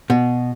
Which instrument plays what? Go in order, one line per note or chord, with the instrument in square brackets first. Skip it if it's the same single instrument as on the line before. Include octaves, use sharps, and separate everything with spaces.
[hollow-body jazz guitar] B2